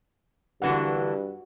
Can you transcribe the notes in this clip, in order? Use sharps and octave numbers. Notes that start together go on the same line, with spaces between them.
G2 D3 E3 A#3 F#4 F#5